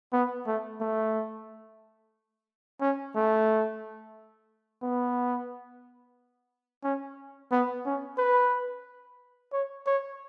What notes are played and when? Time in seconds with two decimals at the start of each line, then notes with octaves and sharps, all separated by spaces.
0.13 B3
0.47 A3
0.81 A3
2.81 C#4
3.15 A3
4.82 B3
6.84 C#4
7.51 B3
7.86 C#4
8.18 B4
9.53 C#5
9.87 C#5